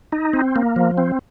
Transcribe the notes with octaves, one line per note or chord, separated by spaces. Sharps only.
D#4
C4
A#3
F3
C4